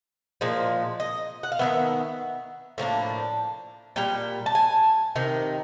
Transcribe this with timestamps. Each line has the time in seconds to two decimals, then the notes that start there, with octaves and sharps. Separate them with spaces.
0.41 A#2 F3 G#3
1.00 D#5
1.43 F#5
1.52 F5
1.59 D#3 G#3 B3 E5
2.78 A2 F3 A#3 D4
3.96 A#2 G3 G5
4.46 A5
4.55 G#5
5.15 C3 D#3